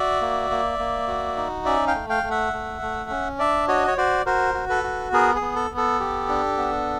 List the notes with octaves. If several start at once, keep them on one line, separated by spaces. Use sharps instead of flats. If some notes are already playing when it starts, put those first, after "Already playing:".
Already playing: F#4 D5 E5
A#3
A#3
A#3
F#4
D#4
C#4 D5 E5
F5 G5
A3
F5 G5
A3
E5 F#5
A3
A3
C#4
D4 D5 E5
F#4 C#5 D#5
C#5
F#4 C5 D5
F#4 A#4 C5
F#4
A4 B4
F#4
B3 G#4 A#4
G#4
B3
A4
B3
A4
G4
D4
B3